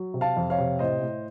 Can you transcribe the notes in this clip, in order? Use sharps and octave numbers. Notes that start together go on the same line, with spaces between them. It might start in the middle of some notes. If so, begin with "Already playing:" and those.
Already playing: F#3
C3
F5 A5
F2
C#5 F5
C3
A2 C5 D#5
A2